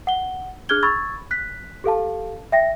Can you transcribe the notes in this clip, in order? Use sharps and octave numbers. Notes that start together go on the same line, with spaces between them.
F#5 G7
D4 G#4 F6 F#6 G#6 G7
B5 C#6 E6 G#6 A6
F#6 B6
G4 A4 F5 A5
E5 G5 A#6